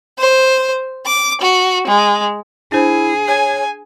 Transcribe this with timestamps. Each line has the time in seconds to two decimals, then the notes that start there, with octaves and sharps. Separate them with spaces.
0.19 C5
1.04 D6
1.42 F#4
1.88 G#3
2.72 D4 E4 G#4 C5
3.28 C#5 G#5